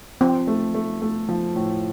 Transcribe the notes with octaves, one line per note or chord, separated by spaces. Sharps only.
F3 C4
A3
A3
A3
F3
A2